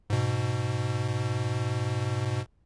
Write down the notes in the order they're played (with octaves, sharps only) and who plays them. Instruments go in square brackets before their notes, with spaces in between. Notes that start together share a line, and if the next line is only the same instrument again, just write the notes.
[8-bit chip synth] G#2 B2